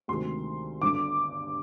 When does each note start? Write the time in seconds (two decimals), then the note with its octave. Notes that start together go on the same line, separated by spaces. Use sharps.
0.08 D2 C3 D#3 G#3 C6
0.81 G1 G2 D3 D6